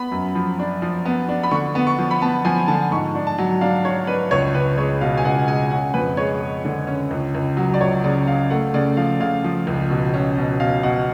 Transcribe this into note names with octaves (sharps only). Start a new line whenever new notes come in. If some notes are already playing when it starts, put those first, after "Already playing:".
Already playing: B3 B5
F#2
F3
D4
F3
B3
D4
B5
D3 C#6
B3
C#6
F3
B5
B3 A5
F3 G#5
D3 A5
G#2 C#6
D4
A5
F#3
D4 F5
D4 C#5
D4 B4
C#2 C#5
C#2 B4
G#3 C#5
B2 F5
G#5
C#2 F#5
G#3 G#5
C#4 F#5
F2 B4
G#3 C#5
G#3
D3
C#4
C#2
C#2
F#3
D5
C#2 C#5
C#3 D5
C#3 F5
A3 F#5
C#3 D5
F3 F5
C#3 F5
F3
C#2
B2
C#4
B2
B2 F5
B2 F#5